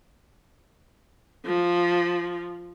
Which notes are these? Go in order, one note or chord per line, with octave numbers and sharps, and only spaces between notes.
F3